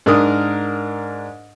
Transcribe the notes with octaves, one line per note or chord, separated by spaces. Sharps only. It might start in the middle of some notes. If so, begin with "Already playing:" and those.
G#2 D4 A#4 D#6